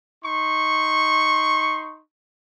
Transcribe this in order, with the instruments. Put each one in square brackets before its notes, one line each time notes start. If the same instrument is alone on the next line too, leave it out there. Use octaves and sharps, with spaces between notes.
[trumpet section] D#4 C6 C#6